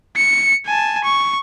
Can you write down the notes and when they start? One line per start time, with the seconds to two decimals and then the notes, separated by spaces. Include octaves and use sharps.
0.16 C#7
0.66 G#5 A5
1.04 C#6